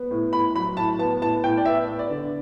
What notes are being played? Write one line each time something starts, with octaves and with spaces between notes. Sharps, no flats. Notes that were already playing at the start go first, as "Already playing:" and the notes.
Already playing: B3
A2
A2 B5
F#3 B5
A2 A5
B3 A5
A2 A5
A2 G5
D5
B3 E5
B3
D5
D3